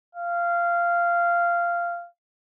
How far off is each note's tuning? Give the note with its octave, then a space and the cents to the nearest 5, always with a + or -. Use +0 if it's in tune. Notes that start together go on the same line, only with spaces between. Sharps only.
F5 -15